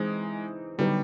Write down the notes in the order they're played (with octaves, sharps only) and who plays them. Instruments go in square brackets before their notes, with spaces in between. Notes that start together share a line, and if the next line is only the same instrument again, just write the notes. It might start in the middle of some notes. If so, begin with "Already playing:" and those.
Already playing: [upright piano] E3 C4 D#4 G#4 [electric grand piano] G#3
[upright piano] D3 F#3 B3 D#4 G4 [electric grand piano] G3